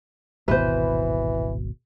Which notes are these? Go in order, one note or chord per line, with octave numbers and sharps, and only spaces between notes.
D#1 G#1 B2 E3 B4 C5